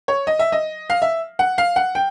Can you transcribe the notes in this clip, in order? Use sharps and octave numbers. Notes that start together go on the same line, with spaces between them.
C#5
D#5
E5
D#5
F5
E5
F#5
F5
F#5
G5